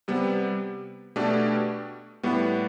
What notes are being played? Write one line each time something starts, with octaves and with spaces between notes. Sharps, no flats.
C3 G3 B3
B2 A3 D4 G4
A2 G3 B3